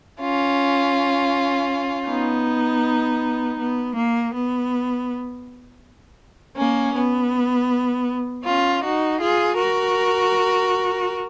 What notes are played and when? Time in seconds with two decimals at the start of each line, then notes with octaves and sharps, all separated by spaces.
0.21 C#4 F4
2.08 B3 D#4
3.58 B3
3.95 A#3
4.34 B3
6.57 A#3 C#4
6.95 B3
8.44 C#4 F4
8.82 D#4 F#4
9.20 F4 G#4
9.57 F#4 A#4